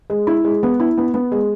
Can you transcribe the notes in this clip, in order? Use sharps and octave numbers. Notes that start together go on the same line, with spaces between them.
G#3
E4
G#3
B3
E4
B3
B3
G#3